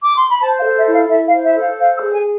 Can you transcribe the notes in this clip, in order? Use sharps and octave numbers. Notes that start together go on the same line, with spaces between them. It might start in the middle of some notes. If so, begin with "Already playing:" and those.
D6
C6
B5
C5 A5
F5
A4
E5
E4 F5
E4 E5
F5
C5
E5
A4
F5
C5 F5
E6
G#4
G#5